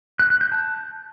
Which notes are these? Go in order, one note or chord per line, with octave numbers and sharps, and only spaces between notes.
F#6
F#6
G6
A5